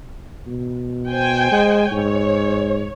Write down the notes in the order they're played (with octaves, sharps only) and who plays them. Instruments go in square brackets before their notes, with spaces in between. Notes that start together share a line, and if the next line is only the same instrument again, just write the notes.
[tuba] B2
[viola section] C5 G5 G#5
[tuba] G#3
[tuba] G#2 [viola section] C#5